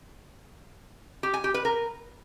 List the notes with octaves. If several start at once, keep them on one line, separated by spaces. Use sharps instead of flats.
G4
G#5
G4
B4
A#4